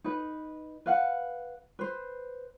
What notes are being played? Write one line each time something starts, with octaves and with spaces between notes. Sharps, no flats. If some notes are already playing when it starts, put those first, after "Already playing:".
D#4 B4
B4 F5 F#5
B4 C5